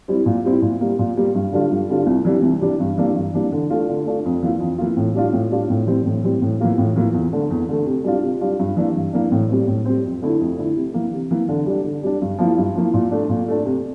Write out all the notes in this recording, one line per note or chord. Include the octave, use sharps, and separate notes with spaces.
G3 C4 E4
A#2
G3 C4 E4
A#2
G3 A#3
A#2
G3 A#3
G2
D3 G3 D4 F4
G2
D3 G3 D4 F4
C2
C3 E3 G3 D4
C2
C3 E3 G3 D4
G2
E3 G3 A#3 D4
G2
E3 G3 A#3 D4
D3
A3 D4 F4
D3
A3 D4 F4
F2
E3 A#3 F4
F2
E3 A#3 F4
A2
G3 D4 F4
A2
G3 D4 F4
A2
E3 G3 C4
A2
E3 G3 C4
A2
E3 A#3 F4
A2
E3 A#3 F4
E2
D3 A3
E2
D3 A3
C3
G3 D4 F4
C3
G3 D4 F4
G2
E3 A#3 D4
G2
E3 A#3 D4
A2
G3 C4
A2
G3 C4
F2
D3 A3 E4
F2
D3 A3 E4
C3
E3 A#3
C3
E3 A#3
D3
G3 D4
D3
G3 D4
G2
F3 A#3 E4
G2
F3 A#3 E4
A#2
A3 D4
A#2
A3 D4
C3